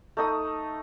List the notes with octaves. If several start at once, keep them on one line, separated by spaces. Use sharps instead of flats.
A3 D#4 D#6